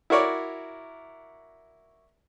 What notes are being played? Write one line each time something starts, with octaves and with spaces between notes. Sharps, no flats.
E4 F#4 A#4 C#5 D5